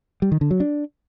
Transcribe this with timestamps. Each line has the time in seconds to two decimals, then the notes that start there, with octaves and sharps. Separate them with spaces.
0.22 G3
0.32 D#3
0.41 D3
0.51 F#3
0.60 D4